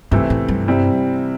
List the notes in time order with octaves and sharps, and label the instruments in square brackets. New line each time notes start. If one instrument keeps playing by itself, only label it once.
[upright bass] G2 [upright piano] C3 E3 A3 C4 E4
[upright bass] A2
G2
[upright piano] C3 G3 C4 E4